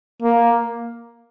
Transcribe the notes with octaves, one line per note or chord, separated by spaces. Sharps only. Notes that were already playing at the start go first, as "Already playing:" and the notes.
A#3